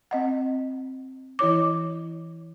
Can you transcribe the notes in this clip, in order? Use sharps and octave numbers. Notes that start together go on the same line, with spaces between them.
C4 D#5 F#5
E3 E4 C#5 D6